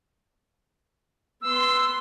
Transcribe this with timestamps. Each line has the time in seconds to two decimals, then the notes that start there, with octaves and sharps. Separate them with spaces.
1.42 B3 C6 E6